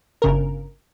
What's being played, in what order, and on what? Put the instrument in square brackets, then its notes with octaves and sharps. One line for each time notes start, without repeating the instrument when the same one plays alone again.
[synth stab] G1 C#3 A#4